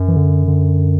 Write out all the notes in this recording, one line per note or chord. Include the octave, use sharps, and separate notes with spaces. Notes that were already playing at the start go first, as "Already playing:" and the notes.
Already playing: F#2
E3
D3
D3